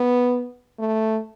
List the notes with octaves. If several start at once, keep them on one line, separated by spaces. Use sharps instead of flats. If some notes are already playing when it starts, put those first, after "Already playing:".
Already playing: B3
A3